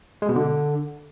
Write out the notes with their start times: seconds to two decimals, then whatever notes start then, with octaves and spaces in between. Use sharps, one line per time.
0.22 G#3
0.29 B2
0.35 D3